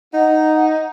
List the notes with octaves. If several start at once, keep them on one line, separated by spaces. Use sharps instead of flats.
D#4 F#5